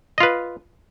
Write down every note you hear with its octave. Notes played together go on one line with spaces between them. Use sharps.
F4 B4 D#5